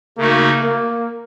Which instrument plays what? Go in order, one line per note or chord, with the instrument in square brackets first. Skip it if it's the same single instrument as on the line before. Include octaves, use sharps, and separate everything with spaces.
[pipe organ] C#3 A3 D#4 F#4 [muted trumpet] A#3
[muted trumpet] A#3